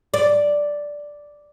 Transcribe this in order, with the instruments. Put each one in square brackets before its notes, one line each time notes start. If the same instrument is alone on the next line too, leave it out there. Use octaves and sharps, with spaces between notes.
[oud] D5